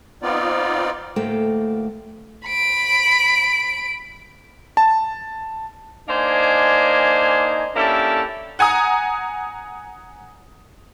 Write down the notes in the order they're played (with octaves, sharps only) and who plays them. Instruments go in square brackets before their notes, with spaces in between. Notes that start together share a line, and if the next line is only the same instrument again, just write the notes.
[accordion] B3 C4 D#4 F4 D5
[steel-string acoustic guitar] D2 A2 A3 A#3 F#4 G5
[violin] B5 D7
[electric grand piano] A5
[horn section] A#3 D4 D#4 C5 G#5
A#3 C#4 D4 E4 G4 A4
[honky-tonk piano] F#5 G#5 A#5 D#6